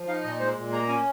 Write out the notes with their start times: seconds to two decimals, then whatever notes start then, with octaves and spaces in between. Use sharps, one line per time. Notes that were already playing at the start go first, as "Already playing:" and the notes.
Already playing: F3
0.08 D#4 F5
0.24 A#2 D#5
0.40 G#3 C5
0.57 A#2
0.72 A#3 A#5
0.82 A#5
0.88 C#4 G#5